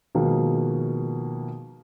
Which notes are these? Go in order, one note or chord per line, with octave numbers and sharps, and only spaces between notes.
B2 D#3 F3 G#3 A#3